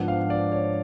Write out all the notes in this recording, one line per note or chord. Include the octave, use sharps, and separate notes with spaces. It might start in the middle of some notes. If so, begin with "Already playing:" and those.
Already playing: G#2 F3 B3 D4 F#5
F5
D5
C#5